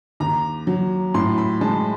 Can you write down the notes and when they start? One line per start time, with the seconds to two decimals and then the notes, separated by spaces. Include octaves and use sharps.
0.20 D#2 A#5
0.67 F#3
1.14 A2 C6
1.38 B5
1.61 G#3 A5